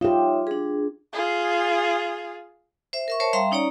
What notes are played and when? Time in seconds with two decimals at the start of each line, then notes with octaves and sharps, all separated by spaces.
0.01 D#4 F4 G4 C#5 E5
0.47 D4 G#4
1.13 F4 G#4
2.93 C5 E5
3.08 A#4 E5 C#6
3.20 A#4 C5 C#5 E5 A5
3.33 G3 E5 F5 G5 A#5 C6
3.51 C#4 D#4 C#5 D5 A#5